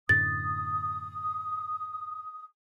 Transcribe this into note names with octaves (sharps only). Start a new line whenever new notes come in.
F#2 A2 D3 D#6 A6